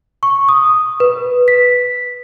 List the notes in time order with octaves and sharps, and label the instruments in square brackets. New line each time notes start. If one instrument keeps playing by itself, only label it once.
[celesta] C#6
D#6
B4
B6